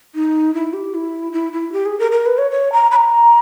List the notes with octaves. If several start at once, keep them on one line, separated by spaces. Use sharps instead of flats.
D#4
E4
G4
E4
E4
E4
G4
G#4
A#4
A#4
B4
C#5
C#5
A#5
B5
A#5